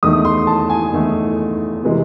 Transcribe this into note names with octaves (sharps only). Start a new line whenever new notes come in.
E2 D#3 A3 D#6
C6
A5
G#5
E2 D#3 A3
C3 E3 G#3